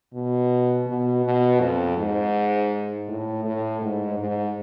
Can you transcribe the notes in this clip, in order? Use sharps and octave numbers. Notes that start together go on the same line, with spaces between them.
B2
B2
B2
F2
G#2
A2
A2
G#2
G#2